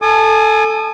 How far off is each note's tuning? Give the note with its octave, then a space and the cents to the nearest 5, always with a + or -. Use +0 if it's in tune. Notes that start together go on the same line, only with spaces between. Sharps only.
A4 +0 G#5 +15 D#6 -35